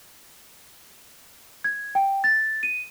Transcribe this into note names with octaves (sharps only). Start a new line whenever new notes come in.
G#6
G5
A6
D#7